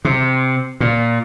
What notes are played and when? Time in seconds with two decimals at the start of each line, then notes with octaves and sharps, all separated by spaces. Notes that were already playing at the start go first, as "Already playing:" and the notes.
0.05 C3
0.80 A#2